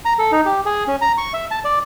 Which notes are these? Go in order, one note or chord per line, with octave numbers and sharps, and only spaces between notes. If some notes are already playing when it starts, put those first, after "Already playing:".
A#5
A4
D#4
G4
G#4
C#4
A#5
C#6
E5
A5
D5